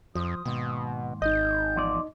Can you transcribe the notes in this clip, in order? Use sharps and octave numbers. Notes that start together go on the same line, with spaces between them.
F2 F3 D#6
D#2 G#2 B2
G#1 D#4 D#5 G6
E2 F3 D5